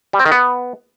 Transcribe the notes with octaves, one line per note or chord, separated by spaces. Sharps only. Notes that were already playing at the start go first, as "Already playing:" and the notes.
G3
C4
D#3
B3